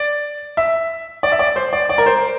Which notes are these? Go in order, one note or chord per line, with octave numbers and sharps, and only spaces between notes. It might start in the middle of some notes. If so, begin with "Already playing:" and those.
Already playing: D5
E5
D5
E5
D5
C5
D5
D5
A#4
C5